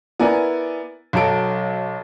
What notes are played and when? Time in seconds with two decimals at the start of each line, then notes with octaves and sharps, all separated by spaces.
0.20 B3 E4 A#4 D5 G#5
1.13 B1 F#3 A4 D7